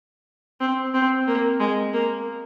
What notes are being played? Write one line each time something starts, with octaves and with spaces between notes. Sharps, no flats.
C4
C4
A#3
G#3
A#3